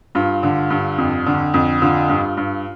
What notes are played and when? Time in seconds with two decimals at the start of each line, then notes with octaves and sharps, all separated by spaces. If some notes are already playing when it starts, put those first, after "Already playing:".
0.15 G2 F4
0.43 D3
0.70 G2
0.98 F2
1.26 D3
1.54 F2
1.82 D3 F4
2.09 G2
2.37 G2